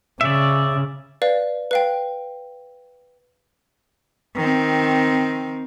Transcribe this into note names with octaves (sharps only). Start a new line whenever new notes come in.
C#3 D5 E5
B4 D5 F5
B4 F5 G5
D#3 C4